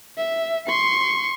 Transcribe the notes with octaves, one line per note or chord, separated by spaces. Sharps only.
E5
C6 C#6